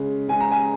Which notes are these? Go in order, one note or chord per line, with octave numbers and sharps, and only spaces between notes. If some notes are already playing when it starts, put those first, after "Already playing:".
Already playing: C#3 G#3
C#3 G#3 G#5
A#5
G#5